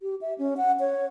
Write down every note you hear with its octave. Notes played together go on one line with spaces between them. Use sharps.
G4
E5
C#4
F#5
C#5